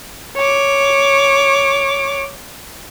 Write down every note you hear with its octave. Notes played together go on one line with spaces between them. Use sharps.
C#5 D6